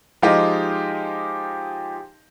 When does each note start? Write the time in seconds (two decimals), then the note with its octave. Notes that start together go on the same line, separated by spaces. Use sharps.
0.22 F3 G#3 D#4 G4 D#5 F5